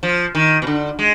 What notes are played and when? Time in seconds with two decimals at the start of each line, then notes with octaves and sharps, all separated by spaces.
0.03 F3
0.35 D#3
0.62 B2
0.67 D3
0.99 G#3